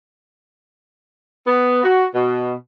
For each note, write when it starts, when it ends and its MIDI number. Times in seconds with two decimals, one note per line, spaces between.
1.47 1.83 59
1.84 2.05 66
2.14 2.53 47